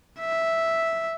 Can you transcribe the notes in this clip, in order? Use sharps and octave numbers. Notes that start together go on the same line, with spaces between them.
E5